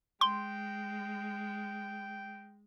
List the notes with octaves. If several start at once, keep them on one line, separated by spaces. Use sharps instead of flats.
G#3 G5 C6